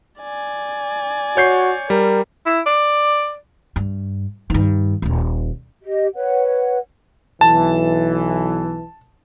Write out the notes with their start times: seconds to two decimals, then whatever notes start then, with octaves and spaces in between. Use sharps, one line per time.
0.20 D5 G#5
1.37 F#4 C#5 G6 C7
1.90 G3 A#4
2.46 E4
2.66 D5
3.76 G2
4.50 G2 D#3
5.02 D#1 G#1
5.81 G4 D#5
6.15 B4 C#5 F#5
7.41 B1 E3 A5